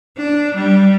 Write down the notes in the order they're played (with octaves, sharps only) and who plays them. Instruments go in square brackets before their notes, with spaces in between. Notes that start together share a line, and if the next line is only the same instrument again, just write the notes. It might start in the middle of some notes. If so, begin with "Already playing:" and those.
[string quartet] D4
G3